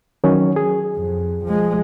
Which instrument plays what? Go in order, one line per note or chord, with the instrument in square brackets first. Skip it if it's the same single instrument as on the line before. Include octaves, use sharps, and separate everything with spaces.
[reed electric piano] D#3 F#3 C#4
G#4
[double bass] F2
F3 G#3